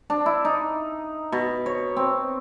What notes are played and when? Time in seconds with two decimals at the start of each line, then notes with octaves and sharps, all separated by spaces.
0.10 D4
0.26 E4
0.45 D#4
1.32 B2
1.66 C#5
1.96 C4